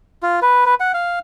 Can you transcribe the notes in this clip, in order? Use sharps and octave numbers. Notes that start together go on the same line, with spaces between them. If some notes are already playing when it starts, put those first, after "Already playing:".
F4
B4
B4
F#5
F5